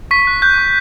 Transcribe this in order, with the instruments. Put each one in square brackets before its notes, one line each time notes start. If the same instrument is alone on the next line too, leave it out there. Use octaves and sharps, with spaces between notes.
[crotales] C#6 B6
F#6
F#6 G6
C#6